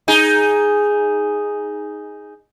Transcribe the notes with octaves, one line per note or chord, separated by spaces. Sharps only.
D#4 G#4